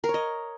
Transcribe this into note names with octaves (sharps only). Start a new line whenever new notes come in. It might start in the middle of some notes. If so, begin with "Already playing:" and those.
A#4
C#5
D#5